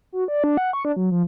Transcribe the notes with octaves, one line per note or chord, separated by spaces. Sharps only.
F#4
D5
D4
F#5
C#6
D4
F#3
F3